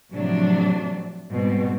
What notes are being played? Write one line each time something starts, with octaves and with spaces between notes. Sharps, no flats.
A2 C3 F3 F#3 D4
G#2 B2 G3 C4